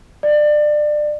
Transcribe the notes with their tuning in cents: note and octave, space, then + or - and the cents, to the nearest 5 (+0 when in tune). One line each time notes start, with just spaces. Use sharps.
D5 +25